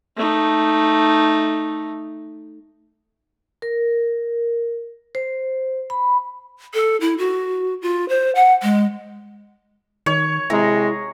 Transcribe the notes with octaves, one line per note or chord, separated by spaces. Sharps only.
A3 D#4
A#4
C5
B5
A4
E4
F#4
F4
C5
F#5
G#3
D#3 C#5
C3 G#3 E4 A#5